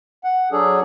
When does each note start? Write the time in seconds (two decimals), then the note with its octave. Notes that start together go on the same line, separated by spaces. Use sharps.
0.24 F#5
0.52 F#3 D4 G#4 A4